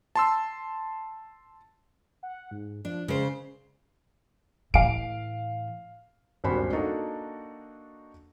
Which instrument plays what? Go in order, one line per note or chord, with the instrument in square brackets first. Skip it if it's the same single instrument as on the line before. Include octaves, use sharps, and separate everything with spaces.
[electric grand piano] A5 C6 E6
[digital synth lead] F#5
G#2
[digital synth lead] F3 [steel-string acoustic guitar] D4
[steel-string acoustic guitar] C#3 C5 [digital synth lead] G#3
[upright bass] A2 E3 [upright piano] F5 D7
[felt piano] D#1 G#1 G2 F#4 C5 B5
A#3 D4 D#4 F#4 A4